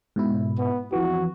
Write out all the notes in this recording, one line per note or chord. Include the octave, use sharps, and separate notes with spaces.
G#2 B2 E4
B3
F2 E3 F#4